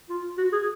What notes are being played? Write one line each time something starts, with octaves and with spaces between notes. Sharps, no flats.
F4
F#4
G#4